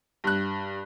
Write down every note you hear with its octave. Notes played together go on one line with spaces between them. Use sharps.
G2 F#6